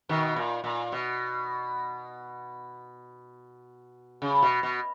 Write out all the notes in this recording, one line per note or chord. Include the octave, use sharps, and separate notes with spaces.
B2 D#3
A#2
A#2
B2
C#3
B2
B2